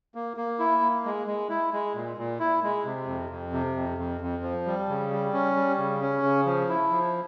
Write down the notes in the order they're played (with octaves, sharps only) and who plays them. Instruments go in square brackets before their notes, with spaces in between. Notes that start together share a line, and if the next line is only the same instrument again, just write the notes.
[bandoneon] A#3
A#3
E4
A#3
G#3
G#3
E4
G#3
A#2
A#2
E4
G#3
C3
F2
F2
C3
F2
F2
F2
F3
G3
C#3
G3
C#4
G3
C#3
C#4
C#3
F3
E4
F3